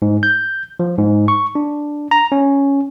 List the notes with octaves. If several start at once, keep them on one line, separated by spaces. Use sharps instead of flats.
G#2
G6
F3
G#2
C#6
D4
A#5
C#4